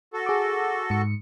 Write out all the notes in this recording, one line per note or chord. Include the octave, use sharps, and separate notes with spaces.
F#4 A4
G#4 D6
G#2 C#7